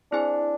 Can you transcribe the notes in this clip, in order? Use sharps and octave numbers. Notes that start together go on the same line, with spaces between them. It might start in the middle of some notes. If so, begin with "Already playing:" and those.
C4 D4 E4 G#4 C5 G#5